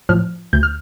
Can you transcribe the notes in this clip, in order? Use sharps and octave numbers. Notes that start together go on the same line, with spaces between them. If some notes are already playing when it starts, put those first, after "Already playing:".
A2 F3 F6
D2 G6
F6